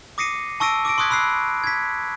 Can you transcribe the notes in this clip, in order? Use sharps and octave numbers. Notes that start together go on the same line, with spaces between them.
D6 D#6 A#6 C7 C#7 D#7
A5 C#6 E6 A#6 D7 D#7
D6 E6 A#6 D7
C6 C#6 D#6 F#6 G#6 B6
B5 C6 E6 F#6 C7
G#6 B6